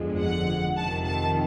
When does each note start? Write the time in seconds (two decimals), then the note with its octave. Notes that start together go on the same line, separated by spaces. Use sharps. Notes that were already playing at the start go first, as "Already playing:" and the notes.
Already playing: G1 F2 D3 F3 G#3
0.21 F#5
0.77 F2 C3 D#3 A5
1.05 A5